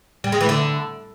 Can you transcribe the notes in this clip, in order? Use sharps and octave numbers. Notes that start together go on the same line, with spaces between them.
G3
G#3
E3
D3